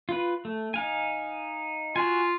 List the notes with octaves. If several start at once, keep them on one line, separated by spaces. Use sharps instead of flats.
F4 B4
A3
D#4 F5 G#5
F4 F#4 G#5